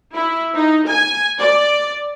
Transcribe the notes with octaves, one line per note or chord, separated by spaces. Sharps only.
E4
D#4
G#5
D5